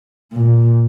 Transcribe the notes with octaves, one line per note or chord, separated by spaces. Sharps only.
A#2